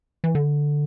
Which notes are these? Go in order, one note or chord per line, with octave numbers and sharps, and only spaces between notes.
E3
D3